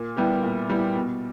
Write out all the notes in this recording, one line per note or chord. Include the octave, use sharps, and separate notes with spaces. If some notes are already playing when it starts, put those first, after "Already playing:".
Already playing: A#2
G3 B3 E4 G4
A#2
G3 B3 E4 G4
B2